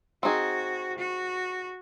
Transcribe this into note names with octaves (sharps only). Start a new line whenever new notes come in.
C4 D#4 F#4 G#4
F#4